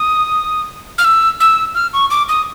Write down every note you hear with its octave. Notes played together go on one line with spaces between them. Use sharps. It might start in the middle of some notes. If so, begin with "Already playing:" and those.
Already playing: D#6
F6
E6
E6
F6
C#6
D6
D#6